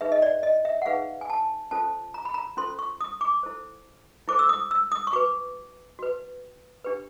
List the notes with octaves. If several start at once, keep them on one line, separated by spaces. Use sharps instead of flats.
D#4 G#4 B4 E5
D#5
D5
D#5
E5
F#5
D#4 G#4 B4 F5
G#5
A5
C#4 F4 A4 C5 A5
A#5
B5
A#5
C#4 F4 A4 C5 C6
C#6
D#6
D6
E4 A4 C5
E4 A4 C5 D6
E6
D#6
E6
D#6
C#6
F#4 B4 D6
F#4 B4
D4 G4 B4